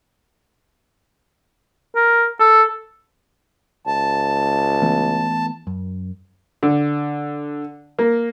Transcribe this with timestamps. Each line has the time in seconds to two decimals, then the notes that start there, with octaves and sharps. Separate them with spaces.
1.96 A#4
2.40 A4
3.87 C#2 A5
4.82 E3 A3 B3
5.67 F#2
6.63 D3
7.99 A#3